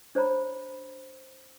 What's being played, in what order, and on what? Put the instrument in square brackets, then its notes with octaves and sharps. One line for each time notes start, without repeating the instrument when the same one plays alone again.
[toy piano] D4 C5 C#5 A#5 B5